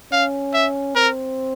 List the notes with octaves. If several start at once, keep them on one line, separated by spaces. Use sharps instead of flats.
C#4 F5
E5
C4 A#4